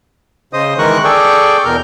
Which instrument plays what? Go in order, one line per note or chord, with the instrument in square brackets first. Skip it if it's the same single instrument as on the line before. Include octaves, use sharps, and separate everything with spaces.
[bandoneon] C#3 C5 D#5 D#6
D#3 E3 G#3 A#4 C#6 F#6
G#4 A4 D5 G5 C#6
E2 B2 A#4 F6 G6